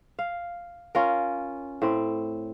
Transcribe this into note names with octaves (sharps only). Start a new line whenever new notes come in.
F5
C#4 F4 A#4
A2 C4